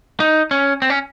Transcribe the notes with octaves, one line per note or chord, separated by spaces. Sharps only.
D#4
C#4
C4
C#4